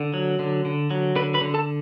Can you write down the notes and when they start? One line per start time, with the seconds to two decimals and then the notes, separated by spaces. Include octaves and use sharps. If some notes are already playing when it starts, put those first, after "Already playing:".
Already playing: D3
0.14 F#3
0.39 D3
0.65 D3
0.91 F#3
1.16 D3 B4 B5
1.34 B4 B5
1.41 D3
1.54 A4 A5